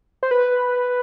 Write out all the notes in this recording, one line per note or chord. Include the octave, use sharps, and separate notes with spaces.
C5
B4